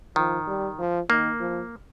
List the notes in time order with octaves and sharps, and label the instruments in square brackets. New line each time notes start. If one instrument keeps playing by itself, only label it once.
[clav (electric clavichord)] D#3 [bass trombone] F3
[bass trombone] G3
F3
[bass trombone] D#3 [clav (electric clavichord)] A#3
[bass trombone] F3